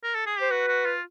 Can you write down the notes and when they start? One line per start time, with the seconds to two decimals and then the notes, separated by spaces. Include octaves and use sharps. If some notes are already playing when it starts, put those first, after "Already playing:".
0.03 A#4
0.15 A4
0.26 G#4
0.38 G4 C5
0.50 F#4 B4
0.68 F#4
0.86 F4